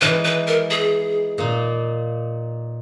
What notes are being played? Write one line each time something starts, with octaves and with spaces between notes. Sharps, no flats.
E3 G#3 D#4 B4
B4
A#4
G#4
A#2 A#3 D#4